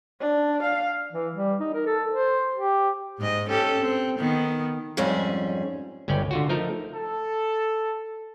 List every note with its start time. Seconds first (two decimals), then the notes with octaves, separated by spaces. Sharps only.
0.20 D4
0.63 F5
1.13 E3
1.35 G3
1.60 D#4
1.74 A#4
1.86 A4
2.11 C5
2.56 G4
3.19 G#2 D#5
3.49 C#4 G4 A4
3.81 C4
4.18 D#3 B3
4.97 F2 G#2 G3 C#4 G#4 G#5
6.08 G1 C#2 C#4 D5 G5
6.31 D3 F4 F#4
6.49 F3 A3 D#4 A#4
6.94 A4